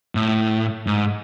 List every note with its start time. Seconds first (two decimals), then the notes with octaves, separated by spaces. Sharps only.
0.15 A2
0.87 G#2